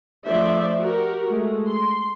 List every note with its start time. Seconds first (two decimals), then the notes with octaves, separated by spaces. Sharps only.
0.25 F3 A3 D4 C5 D5 E5
0.79 F#4 G4 A#4
1.29 G#3 A3
1.67 C6